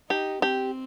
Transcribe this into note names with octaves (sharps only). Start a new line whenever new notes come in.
D#4 G4
C4 G4